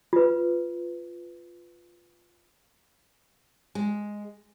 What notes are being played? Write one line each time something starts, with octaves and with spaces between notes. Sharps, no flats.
F4 B4
G#3